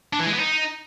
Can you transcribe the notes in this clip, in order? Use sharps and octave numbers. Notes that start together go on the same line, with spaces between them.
D4
E3
G#3
B3
D#4